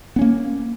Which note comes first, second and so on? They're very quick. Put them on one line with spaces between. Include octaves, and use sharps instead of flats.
B3 C#4 A#3